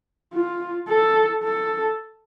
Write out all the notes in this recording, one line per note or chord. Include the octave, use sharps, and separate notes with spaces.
F4
A4
A4